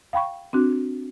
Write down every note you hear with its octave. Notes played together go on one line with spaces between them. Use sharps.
F5 G5 B5 C#6
C4 D4 F#4